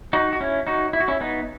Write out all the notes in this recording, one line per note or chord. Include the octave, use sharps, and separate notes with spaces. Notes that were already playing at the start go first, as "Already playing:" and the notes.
D#4 F#4
F#4
C#4 E4
D#4 F#4
E4
F#4
C#4 E4
B3 D#4